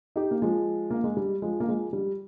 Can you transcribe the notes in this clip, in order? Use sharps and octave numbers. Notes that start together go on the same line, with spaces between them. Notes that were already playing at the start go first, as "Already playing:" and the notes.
D#4 G4
A#3
F3 G#3
A#3
G#3
G3
F3 G#3
A#3
F3 G#3
G3